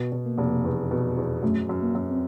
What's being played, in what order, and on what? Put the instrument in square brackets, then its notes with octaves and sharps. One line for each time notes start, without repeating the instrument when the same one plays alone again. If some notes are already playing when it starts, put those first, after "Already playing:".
Already playing: [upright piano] B2
B2
[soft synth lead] A#3
[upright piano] F1
E2
B2
E2
[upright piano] F#2 [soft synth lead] A3
[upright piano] F#2
[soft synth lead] A#3
[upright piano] F#2
[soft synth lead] C4